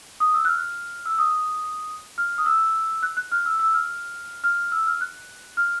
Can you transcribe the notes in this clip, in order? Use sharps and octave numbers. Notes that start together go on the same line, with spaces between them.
D#6
E6
F#6
F6
E6
D#6
F6
D#6
E6
F#6
F#6
F6
E6
E6
F6
F6
E6
F6
F#6
F6